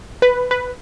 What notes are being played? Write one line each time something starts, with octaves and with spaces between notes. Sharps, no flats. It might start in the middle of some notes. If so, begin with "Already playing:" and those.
B4
B4